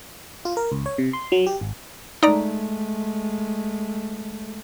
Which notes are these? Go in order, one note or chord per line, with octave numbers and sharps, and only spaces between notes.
F4
A#4
C#2
C#5
C3
C6
F#3
G4
G#1
G#3 A3 D#4 D5 A#5